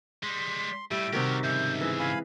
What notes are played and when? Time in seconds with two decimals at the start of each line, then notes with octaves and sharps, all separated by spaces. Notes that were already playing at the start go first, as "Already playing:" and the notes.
0.23 G3 G#3 C6 B6
0.91 A2 G3 E5 D7
1.13 C3 D#3 F#4 G4 A#4
1.44 G#2 C#3 E5 G6
1.81 E3 G#4 E6
1.99 F5 G#5 B5